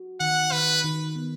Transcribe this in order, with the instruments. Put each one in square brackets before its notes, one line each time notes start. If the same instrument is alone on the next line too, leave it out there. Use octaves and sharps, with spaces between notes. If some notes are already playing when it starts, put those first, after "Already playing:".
Already playing: [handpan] F#4
[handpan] D#3 [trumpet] F#5
[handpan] D#3 [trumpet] B4
[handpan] D#3
B3